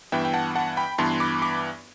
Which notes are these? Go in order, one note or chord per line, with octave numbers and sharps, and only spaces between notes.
G2 E3 B3 E5 G5
G5
F#5 A5
F#5 A5
G5 B5
G2 E3 B3 A5 C6
B5 D6
B5 D6